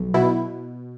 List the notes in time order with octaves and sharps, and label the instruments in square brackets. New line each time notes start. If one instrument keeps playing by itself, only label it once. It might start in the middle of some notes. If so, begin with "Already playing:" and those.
Already playing: [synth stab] B1
B2 E4